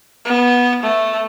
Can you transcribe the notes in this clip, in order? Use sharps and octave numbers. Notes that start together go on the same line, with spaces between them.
B3
A3